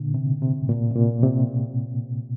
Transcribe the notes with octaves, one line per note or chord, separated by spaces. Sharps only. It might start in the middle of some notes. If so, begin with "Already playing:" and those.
Already playing: A#2 D3
C3
C3
A2
A#2
C3
A#2
C3